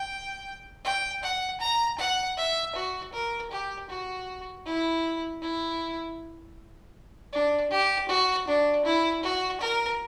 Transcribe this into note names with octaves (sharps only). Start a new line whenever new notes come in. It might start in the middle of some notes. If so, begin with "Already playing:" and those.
Already playing: G5
G5
F#5
A#5
F#5
E5
F#4
A#4
G4
F#4
E4
E4
D4
G4
F#4
D4
E4
F#4
A#4